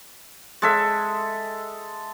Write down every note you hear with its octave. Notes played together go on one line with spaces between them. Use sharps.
G#3 A4 E5